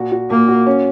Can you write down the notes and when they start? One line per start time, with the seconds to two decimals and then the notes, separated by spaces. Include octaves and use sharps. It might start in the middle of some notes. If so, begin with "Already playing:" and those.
Already playing: A#2 F#4
0.12 F#4
0.30 A#2 A#3
0.48 F#4
0.67 C#4